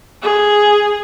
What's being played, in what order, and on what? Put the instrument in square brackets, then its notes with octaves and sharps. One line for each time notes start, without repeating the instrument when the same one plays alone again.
[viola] G#4